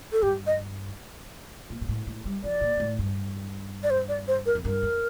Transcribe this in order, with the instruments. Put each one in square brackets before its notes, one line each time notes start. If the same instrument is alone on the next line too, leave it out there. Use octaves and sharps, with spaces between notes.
[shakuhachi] A4
[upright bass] G2 [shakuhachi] G4
[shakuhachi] D#5
[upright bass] A#2
A#2
A2
A2
G3
[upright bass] F3 [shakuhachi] D5
[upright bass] A#2
A#2
A2
G2
[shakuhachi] D5
C5
D5
C5
A#4
[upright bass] F2
[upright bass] G2 [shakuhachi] A#4
[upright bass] F2